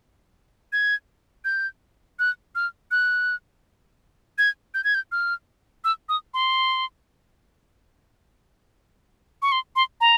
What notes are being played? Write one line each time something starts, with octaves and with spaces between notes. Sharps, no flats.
G#6
G6
F#6
F6
F#6
G#6
G6
G#6
G6
F6
E6
D#6
C6
C#6
C6
C6
A#5